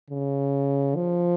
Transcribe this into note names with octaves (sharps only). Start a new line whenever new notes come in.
C#3
F3